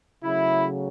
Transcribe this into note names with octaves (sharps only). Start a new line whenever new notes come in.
C#3 F#3 A3 E4